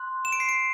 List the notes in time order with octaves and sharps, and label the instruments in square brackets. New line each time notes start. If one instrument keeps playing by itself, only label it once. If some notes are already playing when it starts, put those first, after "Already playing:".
Already playing: [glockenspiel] C6 F#6
E7
D7
C7
D7